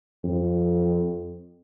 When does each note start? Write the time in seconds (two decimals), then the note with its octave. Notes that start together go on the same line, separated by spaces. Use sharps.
0.24 F2